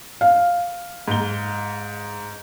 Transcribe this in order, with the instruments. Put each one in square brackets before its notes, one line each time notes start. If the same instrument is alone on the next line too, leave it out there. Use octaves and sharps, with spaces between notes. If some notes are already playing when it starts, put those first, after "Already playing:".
[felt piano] F5
[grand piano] G#2 G7